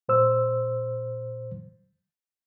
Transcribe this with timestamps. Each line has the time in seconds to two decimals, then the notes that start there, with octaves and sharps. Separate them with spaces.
0.09 A#2 C5 E6